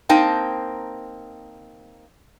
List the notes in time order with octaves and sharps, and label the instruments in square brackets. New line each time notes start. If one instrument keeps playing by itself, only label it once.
[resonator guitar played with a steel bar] A#3 C4 D#4 G5 A5